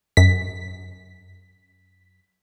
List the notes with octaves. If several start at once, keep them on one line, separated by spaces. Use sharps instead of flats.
F#2 B6